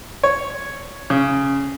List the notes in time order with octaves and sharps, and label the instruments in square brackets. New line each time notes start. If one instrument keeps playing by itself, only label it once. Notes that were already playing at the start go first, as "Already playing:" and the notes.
[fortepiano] C#5
C#3